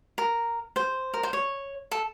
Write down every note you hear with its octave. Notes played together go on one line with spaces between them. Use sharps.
A#4
C5
A#4
C5
C#5
A4